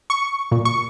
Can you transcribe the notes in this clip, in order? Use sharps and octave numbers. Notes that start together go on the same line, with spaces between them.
C#6
A#2
C#6